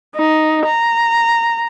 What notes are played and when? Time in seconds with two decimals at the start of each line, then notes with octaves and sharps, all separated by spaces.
0.16 D#4
0.66 A#5